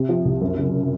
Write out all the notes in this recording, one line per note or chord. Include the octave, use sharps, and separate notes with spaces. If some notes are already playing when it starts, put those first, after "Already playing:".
Already playing: C3
F3
C2
F#2
C#3